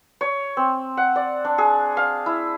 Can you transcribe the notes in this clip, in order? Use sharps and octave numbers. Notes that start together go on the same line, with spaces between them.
C#5
C4
F#5
D5
D4
G#4
F5
E4